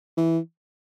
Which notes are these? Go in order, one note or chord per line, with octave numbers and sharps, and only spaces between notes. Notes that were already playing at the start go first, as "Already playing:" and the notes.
E3